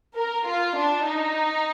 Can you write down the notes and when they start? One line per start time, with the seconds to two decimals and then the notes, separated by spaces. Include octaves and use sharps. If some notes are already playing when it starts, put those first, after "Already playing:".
0.17 A#4
0.48 F4
0.77 D4
1.07 D#4